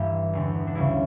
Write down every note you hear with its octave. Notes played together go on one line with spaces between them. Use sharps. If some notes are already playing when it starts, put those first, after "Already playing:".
Already playing: G1 G2 E3 G3 G4
E1 E2 D3
D4
D2 C#3 G3 E4